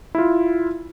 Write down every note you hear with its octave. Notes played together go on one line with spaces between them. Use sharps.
E4 F4